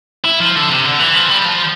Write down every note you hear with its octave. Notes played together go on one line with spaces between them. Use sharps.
E4
F3
D3
C3
D3
E3
F3
G3
F3